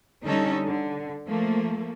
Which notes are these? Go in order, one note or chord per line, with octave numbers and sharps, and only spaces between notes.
D3 G3 C#4 D#4 A4
D3
F3 A3 A#3